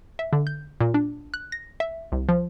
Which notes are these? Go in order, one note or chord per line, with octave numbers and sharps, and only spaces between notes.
E5
D3
G6
A#2
D4
F#6
A#6
E5
C2
F3